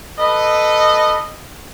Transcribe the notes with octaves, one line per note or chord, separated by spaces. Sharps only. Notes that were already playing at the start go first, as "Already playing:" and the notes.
A4 B4 D#5